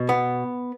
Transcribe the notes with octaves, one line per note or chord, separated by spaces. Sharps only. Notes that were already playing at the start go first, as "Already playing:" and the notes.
Already playing: B2
B3